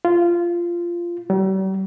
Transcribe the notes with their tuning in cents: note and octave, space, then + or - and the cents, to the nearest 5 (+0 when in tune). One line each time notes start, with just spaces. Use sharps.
F4 -15
G3 -45